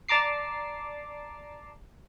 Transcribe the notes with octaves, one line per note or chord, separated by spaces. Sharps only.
D5 A5 A#5 D6 C7